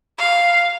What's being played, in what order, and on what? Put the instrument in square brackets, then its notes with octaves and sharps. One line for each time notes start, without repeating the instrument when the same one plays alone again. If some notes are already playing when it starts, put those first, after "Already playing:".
[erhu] F5